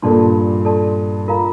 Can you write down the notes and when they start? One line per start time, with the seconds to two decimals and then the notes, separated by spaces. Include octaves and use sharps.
0.02 G2 A#2 A4 D5 A5 C6
0.65 A4 D5 A5 C6
1.28 F4 A#4 F5 A#5